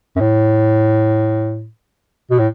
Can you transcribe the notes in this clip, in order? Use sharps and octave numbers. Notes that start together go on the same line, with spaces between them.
F#2
A2
B2
A2